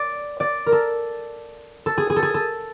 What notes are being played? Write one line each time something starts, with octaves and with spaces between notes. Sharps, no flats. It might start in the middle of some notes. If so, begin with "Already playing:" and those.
Already playing: D5
D5
A#4
A4
A4
G#4
G#4
A4
G#4
A4